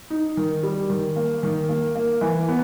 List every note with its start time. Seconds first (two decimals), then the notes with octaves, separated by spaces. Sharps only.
0.10 D#4
0.37 D#3
0.63 G3
0.90 D#3
1.16 A#3
1.43 D#3
1.69 A#3
1.95 A#3
2.21 E3
2.49 B3